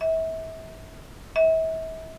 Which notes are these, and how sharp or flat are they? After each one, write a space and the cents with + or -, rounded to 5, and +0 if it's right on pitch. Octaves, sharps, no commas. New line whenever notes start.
E5 -30
E5 -35